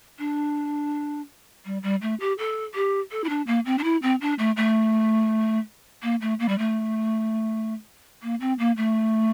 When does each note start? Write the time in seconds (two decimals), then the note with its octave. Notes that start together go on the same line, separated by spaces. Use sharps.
0.19 D4
1.65 G3
1.83 G3
2.02 A3
2.20 G4
2.38 A4
2.75 G4
3.11 A4
3.24 E4
3.29 D4
3.47 A#3
3.66 C4
3.78 D4
3.84 E4
4.02 C4
4.21 D4
4.39 A3
4.57 A3
6.03 A#3
6.21 A3
6.40 A#3
6.48 G3
6.58 A3
8.22 A#3
8.40 C4
8.59 A#3
8.77 A3